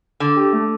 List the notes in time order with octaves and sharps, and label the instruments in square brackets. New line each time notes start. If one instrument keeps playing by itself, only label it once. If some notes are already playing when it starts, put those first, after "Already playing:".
[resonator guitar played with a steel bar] D3
[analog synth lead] G4
A3